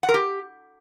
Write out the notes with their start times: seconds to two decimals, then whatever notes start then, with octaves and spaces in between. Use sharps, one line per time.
0.03 F#5
0.09 A#4
0.14 G4